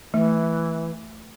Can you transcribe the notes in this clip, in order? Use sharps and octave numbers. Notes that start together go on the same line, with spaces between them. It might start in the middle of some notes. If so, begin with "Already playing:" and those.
E3 A3